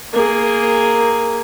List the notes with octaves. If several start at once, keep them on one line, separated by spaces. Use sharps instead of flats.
A#3 G#4